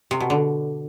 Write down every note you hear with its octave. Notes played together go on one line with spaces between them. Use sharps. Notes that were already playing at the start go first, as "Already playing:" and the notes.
C3
B2
D3